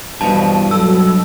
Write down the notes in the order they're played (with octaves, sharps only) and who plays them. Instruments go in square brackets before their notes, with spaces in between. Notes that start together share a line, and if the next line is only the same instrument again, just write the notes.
[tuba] E2 [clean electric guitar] G2 B2 [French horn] F3 [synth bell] A5
[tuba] F#3 [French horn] A4 [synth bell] E6